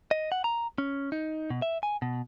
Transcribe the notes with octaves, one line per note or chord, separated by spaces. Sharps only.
D#5
F#5
A#5
C#4
D#4
B2
E5
G#5
B2